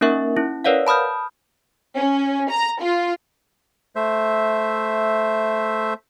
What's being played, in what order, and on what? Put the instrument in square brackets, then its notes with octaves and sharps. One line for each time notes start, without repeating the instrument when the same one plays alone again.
[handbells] A#3 C#4 D#4 A#4 E5 C#6
C#4 E4
A#4 B4 C#5 D5 F5 F#5
A5 B5 D#6 F6 G6
[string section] C#4
A#5
F4
[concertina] A3 C5 E5